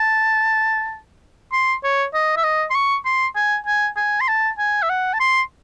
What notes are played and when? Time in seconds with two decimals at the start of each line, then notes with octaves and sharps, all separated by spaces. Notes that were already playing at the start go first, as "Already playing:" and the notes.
Already playing: A5
1.53 C6
1.84 C#5
2.14 D#5
2.37 E5
2.44 D#5
2.70 C6
2.75 C#6
3.05 C6
3.36 G#5
3.66 G#5
3.97 G#5
4.21 C6
4.28 A5
4.58 G#5
4.82 E5
4.90 F#5
5.13 A5
5.20 C6